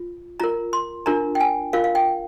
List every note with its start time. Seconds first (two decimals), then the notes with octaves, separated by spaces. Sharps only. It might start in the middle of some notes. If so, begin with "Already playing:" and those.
Already playing: F4
0.40 F4 A#4 A#5
0.73 C6
1.06 D4 F4 A#4 A#5
1.35 G5
1.40 G#5
1.73 F4 A#4 F5
1.84 F5
1.95 G5